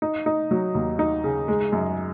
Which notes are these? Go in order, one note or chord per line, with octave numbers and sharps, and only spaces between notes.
D#4
D#4
F#3
D#2
D#4
C#3
G#3
F#2